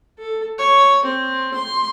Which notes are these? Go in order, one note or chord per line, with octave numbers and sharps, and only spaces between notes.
A4
C#5
C4
C6